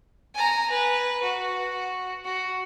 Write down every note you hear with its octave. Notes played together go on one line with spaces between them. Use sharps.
G#5 A#5
B4
F#4
F#4